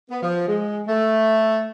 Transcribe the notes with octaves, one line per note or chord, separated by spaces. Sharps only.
B3
F3
G#3
A3